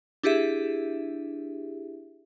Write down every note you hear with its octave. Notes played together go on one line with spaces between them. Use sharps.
D4 E4 G4 G#4 E5